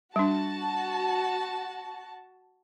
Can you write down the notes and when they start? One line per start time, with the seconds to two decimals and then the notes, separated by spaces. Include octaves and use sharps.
0.16 G3 D4 F#4 A5